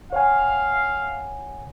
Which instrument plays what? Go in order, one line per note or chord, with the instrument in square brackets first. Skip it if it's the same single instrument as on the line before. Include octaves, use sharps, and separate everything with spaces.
[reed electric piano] C#5 F#5 G#5 [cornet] F5